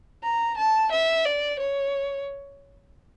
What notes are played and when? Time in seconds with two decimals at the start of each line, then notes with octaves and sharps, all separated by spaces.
0.24 A#5
0.58 A5
0.92 E5
1.25 D5
1.60 C#5